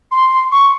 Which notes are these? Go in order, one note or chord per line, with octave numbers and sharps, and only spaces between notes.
C6
C#6